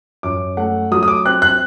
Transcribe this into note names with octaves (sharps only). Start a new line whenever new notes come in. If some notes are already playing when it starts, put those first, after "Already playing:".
F#2 D6
A3 F#5
F#3 D#6
D#6
D6
C4 F#6
F#6